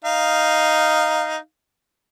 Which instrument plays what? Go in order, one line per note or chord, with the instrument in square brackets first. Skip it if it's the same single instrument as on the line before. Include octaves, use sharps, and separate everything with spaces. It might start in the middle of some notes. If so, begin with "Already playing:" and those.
[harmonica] D#4 F5